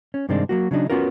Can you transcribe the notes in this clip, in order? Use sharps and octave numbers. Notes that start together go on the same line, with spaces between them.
C#4
G2 C3 D#3 G#3 C4 D4
F#3 A#3 F#4
C#3 F#3 D4 D#4
B3 C#4 F4 F#4 A#4